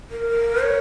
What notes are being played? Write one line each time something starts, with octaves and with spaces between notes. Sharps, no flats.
A#4
C#5